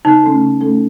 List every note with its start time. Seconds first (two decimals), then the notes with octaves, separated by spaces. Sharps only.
0.05 C#3 D#4
0.23 A3 C#4 A4
0.42 C#3
0.60 A3 C#4 A4